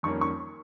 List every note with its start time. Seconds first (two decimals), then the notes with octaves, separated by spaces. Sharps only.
0.03 F2 D#3 G3 A#3 C#4 C#6
0.21 C#6